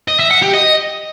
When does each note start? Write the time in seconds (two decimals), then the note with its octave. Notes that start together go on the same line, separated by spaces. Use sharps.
0.08 D#5
0.19 E5
0.31 F#5
0.43 G4
0.54 D#5